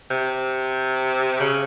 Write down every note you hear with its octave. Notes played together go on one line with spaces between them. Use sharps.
C3
C#3